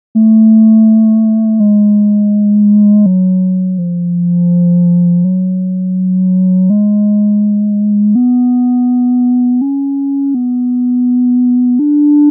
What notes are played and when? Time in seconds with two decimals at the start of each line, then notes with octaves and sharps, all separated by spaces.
0.15 A3
1.60 G#3
3.06 F#3
3.78 F3
5.25 F#3
6.70 G#3
8.15 B3
9.61 C#4
10.35 B3
11.79 D4